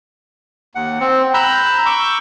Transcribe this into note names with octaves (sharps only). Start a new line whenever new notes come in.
D#2 F#5
C4
A#5 B5 E6 F#6 G6
C#6 D6 E6 G6